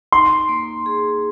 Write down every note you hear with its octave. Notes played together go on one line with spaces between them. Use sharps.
D#4 C6
A#3
G#4